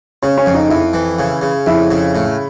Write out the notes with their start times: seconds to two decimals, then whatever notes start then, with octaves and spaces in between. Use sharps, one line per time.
0.22 C#3 C#4
0.38 C#4
0.46 F2
0.54 D#4
0.70 F2 E4
0.94 E3
1.19 C#3
1.42 C#3
1.66 F2 E4
1.91 C#3
2.15 A2